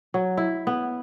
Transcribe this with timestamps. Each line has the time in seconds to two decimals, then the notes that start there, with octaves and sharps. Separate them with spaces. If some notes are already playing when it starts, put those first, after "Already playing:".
0.14 F#3
0.37 E4
0.67 B3